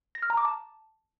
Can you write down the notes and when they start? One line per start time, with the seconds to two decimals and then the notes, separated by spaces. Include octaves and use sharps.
0.15 A#6
0.22 F6
0.30 A#5
0.37 D6
0.45 A5